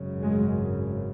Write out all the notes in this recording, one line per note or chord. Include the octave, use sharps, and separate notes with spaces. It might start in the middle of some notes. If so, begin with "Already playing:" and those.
Already playing: G#1 F#2 C#3
G#3